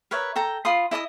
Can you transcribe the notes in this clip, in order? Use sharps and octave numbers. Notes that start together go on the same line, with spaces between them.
A#4 B4 C#5 E5
A4 G5 A#5
F4 B5 C6 D#6
E4 D#5 A5 D#6